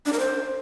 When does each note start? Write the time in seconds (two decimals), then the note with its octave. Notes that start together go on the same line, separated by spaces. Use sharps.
0.06 D4
0.13 A#4
0.19 C5